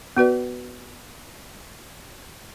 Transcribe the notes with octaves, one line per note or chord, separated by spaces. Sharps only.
B3 F#4 B4 D5